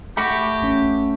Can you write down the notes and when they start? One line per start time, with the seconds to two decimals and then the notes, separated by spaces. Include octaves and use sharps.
0.17 A3 F#4 G4 B5 D6
0.62 A1 C#4